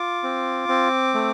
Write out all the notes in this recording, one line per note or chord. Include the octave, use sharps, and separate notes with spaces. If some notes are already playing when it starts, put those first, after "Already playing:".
Already playing: F4 D6
C4
C4
A3